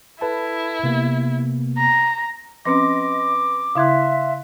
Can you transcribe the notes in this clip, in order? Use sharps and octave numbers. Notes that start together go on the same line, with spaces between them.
E4 A4 B4 A5
C3 A#3 B3
A#5
F3 C4 C#4 B4 D#5 C6 D6 A#6
C#3 E4 E5 F5 C6 F#6 G#6